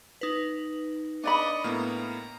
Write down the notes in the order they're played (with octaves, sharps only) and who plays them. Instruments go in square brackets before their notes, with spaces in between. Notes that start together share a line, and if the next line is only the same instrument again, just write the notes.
[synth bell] D#4 B4
[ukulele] D4 D5 B5 [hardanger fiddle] D#5 C#6
[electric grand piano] A2 A#3 B3 [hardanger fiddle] A#5 [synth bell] F6